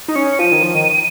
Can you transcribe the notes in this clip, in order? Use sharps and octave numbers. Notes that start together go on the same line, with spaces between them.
D#4
C#4 C#7
F3 D#7
D#3
F3
D#3